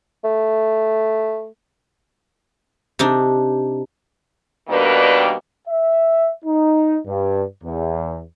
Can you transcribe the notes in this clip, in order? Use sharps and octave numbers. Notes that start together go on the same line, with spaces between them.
A3
C3 D4 D#4
B2 D#3 G3 A#3 D4 B4
E5
D#4
G2
E2